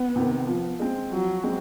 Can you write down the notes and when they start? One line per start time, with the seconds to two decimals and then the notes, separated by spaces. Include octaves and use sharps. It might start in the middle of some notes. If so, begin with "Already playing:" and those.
Already playing: B3
0.16 C3 D#3
0.47 F3
0.80 G#3 C4
1.11 F3 F#3
1.44 G#3 C4